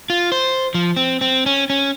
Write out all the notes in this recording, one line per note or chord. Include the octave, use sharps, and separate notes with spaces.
F4
C5
F3
C4
C4
C#4
C#4